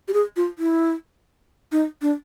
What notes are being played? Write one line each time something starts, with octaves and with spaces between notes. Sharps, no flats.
G4
G#4
F4
E4
D#4
D4